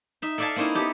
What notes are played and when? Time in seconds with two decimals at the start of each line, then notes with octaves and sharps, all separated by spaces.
0.22 D#4 E5
0.38 A4 D5 E5 F5 G#5 A5
0.56 A#3 C4 C#4 D#4 E4
0.75 B3 G4 A4